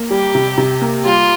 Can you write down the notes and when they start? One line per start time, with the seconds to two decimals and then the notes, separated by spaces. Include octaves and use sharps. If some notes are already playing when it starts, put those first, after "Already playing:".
Already playing: A#3
0.10 G3 G4
0.35 C3
0.58 C3
0.82 A#3
1.05 G3 F4